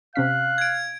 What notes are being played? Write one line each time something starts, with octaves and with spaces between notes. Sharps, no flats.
C3 C#4 F5 F#6 B6
G#6 D7